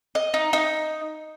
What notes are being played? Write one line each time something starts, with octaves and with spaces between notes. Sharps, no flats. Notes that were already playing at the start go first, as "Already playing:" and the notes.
D#5
D#4
D#4